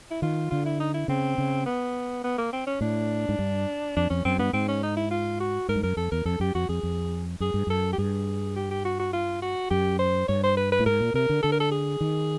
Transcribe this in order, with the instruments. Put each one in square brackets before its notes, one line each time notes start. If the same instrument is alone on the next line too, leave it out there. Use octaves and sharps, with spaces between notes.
[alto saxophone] E4
[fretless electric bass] D#3 [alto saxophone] F4
[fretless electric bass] D3 [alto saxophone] F4
[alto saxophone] E4
D#4
E4
[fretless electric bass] C#3 [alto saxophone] C4
[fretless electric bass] C#3
[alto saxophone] B3
B3
A#3
C4
C#4
[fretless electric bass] A2 [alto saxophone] D4
[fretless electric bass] G#2
G2
[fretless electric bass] F2 [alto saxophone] D4
[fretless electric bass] F2 [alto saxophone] C#4
[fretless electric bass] F#2 [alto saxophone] C4
[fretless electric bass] G2 [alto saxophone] B3
[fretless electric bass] G#2 [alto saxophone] C4
[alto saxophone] C#4
D#4
E4
F4
F#4
[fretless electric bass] G#2 [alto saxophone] A#4
[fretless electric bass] G2
[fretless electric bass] F#2 [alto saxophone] A#4
[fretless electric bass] F2 [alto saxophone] A4
[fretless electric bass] E2 [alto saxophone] A#4
[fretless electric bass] F2 [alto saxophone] A4
[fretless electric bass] F#2 [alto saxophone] G4
[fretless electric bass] F2 [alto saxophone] F#4
[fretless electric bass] F2 [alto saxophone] G#4
[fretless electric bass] F2
[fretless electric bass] F#2 [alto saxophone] G#4
[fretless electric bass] G2
[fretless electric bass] F#2 [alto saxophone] A4
[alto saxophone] G4
[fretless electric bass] G2 [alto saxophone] G#4
[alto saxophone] G4
G4
F#4
F#4
F4
F#4
[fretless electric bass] F#2 [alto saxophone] G4
[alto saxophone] C5
[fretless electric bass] G2 [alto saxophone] C#5
[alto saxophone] C5
B4
B4
[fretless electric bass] A2
[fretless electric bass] G#2 [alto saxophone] A#4
[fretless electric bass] A#2
[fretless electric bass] C3 [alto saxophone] A#4
[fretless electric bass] D3
[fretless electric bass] D3 [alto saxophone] A4
[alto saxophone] A#4
A4
G#4
[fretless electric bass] D#3